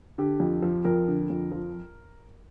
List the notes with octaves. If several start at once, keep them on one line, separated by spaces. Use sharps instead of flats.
D3 G4
F2
F3
F2 A#4
D3
F2
F3